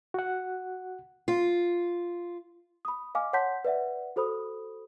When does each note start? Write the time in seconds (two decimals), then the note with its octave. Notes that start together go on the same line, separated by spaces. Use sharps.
0.14 F#4 F#5
1.28 F4
2.85 B5 D#6
3.15 D#5 F5 G#5 D6 F6
3.33 C#5 F#5 A5 C6 G6 B6
3.65 B4 D5 E5 F#5
4.16 F#4 A4 C5 B5 D#6